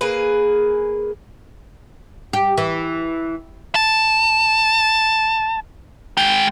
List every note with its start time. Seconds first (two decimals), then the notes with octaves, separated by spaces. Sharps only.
0.01 A#3 G#4 B4
2.33 G4
2.58 E3
3.75 A5
6.17 G#3 G5